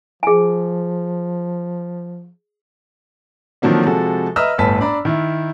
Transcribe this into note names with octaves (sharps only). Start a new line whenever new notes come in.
F3 G#4 G#5
D3 D#3 F3 F#3 A#3 C4
C3 F3 G#3 F#4 A4
B4 D#5 E5 A#5 E6 F6
G1 A2 B4 G#5 A5 B6
D4 D5 A#5 B5
D#3 E4